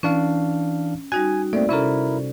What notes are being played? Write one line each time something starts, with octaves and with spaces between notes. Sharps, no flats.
E3 C#4 D4 F5
G3 D#4 F#4 G#5
A3 A#3 C4 D5
C3 C#4 E4 A4 A#4